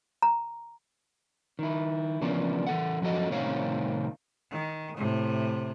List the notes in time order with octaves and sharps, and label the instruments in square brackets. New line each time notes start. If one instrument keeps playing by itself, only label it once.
[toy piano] A#5
[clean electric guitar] D#3 E4
C#3 E3 F3 A#3 B3 D4
E3 A4 F#5
F#2 D3 F3 F#4 A4 D#5
C2 A2 D#3 C4 C#5 F5
[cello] D#3
A2 C3